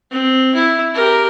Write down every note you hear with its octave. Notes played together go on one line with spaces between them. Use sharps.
C4
E4
G4 A#4